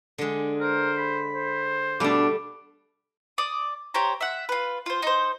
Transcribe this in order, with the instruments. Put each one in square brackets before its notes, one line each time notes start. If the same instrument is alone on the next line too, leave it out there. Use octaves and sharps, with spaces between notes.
[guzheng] D3 G#3
[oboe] A#4 [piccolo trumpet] C5
[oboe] B5
[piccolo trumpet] C5
[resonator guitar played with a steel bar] B2 D4 [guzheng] G3 A3 [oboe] D6
[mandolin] D5 D#6
G4 C5 C#5 A#5
E5 F#5
F4 B4
F4 C5
D#4 C5